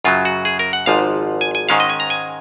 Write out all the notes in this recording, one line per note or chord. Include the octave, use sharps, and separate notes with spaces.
F#2 C#3 F#3 F4
F#4
G#4
A#4
F#5
G#1 G#2 F3 F5
G#5
G#5
G#2 D#3 G#3 C#4 F5
D#5
G#5
A#5
G#5